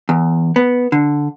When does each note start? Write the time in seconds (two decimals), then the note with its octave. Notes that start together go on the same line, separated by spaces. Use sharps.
0.09 E2
0.56 B3
0.92 D3